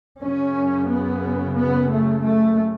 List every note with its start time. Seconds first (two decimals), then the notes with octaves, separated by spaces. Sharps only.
0.22 F#2 C#3 C#4
0.89 B3
1.57 B3
1.91 A3
2.25 A3